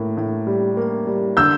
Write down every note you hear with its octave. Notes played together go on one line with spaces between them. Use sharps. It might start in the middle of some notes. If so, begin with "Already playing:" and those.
Already playing: A2 A#3
A2
G3
A#3
G3
D3 E6 G6